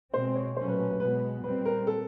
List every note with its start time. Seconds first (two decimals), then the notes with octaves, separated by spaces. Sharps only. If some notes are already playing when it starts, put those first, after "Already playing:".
0.13 B2 G#3 C4 C5
0.35 C#5
0.56 A#2 F#3 A3 C#4 C5
0.68 B4
0.79 B4
0.90 B4
1.00 B2 G#3 B3 B4
1.43 A#2 G3 C4 B4
1.65 A#4
1.87 A4